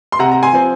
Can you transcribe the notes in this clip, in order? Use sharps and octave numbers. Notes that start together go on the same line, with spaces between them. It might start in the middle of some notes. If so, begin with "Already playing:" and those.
C6
C3 F#5 A#5
A#5
G#5 C6
F3 C4